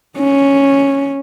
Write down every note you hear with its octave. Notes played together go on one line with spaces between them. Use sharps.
C#4